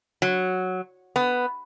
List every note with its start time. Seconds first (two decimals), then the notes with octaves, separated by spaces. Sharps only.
0.22 F#3
1.16 B3